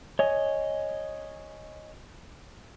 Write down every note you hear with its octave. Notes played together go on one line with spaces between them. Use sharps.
C#5 D#5 G#5